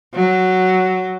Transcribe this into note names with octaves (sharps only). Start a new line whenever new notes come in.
F#3